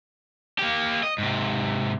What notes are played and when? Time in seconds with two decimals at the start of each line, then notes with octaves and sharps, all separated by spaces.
0.59 A#3 G4
1.03 D#5
1.18 G#2 C3